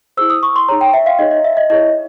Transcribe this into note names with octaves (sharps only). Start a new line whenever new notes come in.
E4 G#4 C5 E6
D#6
C#6
C6
D#4 G#4 C#5 A#5
G5
E5
F5
D#4 G#4 C#5 D#5
D#5
E5
D#5
E4 G#4 C#5 D#5